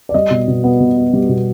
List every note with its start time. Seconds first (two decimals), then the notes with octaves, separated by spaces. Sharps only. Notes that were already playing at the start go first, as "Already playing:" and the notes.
0.09 D5
0.14 G3 D#5
0.30 B2
0.48 B2
0.64 B3
0.80 B2
0.97 B3
1.13 G3
1.29 B2